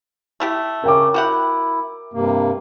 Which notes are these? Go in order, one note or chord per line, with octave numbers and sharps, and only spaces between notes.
A3 E4 G4
C#3 C#4 A#4 G5 D6
E4 F#4 G4 F#5
G2 C3 A#3